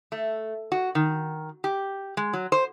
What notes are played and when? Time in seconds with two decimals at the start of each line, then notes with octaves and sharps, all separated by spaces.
0.12 A3
0.72 F#4
0.95 D#3
1.64 G4
2.17 G#3
2.34 F#3
2.52 C5